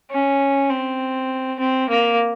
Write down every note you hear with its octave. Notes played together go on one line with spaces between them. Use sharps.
C#4
C4
C4
A#3